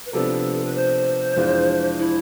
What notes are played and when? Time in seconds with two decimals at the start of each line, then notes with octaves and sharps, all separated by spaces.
0.06 B4
0.13 C3 F3 B3 D4 A4
0.64 B4
0.75 C5
1.36 F2 E3 G#3 D4 F4
1.98 E4